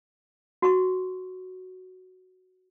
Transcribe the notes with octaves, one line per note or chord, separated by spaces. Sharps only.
F#4 C#6